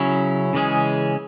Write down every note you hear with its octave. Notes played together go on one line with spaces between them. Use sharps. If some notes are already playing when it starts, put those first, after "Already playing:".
Already playing: C#3 F#3 C#4 E4
C#3 E3 G#3 C#4 G#4